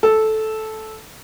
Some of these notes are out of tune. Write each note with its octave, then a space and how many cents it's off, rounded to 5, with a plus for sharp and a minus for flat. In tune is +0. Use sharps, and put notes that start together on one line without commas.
A4 -10